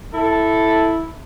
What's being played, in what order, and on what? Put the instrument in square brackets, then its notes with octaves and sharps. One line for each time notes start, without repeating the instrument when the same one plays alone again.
[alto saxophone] E4 [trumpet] A4